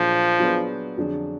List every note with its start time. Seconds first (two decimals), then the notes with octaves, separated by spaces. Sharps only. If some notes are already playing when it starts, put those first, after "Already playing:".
Already playing: A#2 F3 F#3 D4 G#4 D5
0.40 F#3 B3 D4 G#4 B4
0.97 F2 D3 F#3 D4 G#4